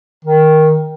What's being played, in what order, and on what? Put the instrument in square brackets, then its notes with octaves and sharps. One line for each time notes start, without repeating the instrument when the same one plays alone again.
[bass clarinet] D#3